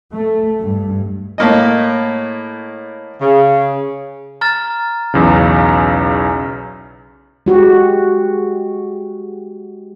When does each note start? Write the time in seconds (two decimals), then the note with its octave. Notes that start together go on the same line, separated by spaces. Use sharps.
0.14 A3
0.60 G2
1.38 A2 A#3 D#5
3.20 C#3
4.41 A#5 F6 A6
5.14 B1 E2 C#3
7.46 G#3 F#4 G4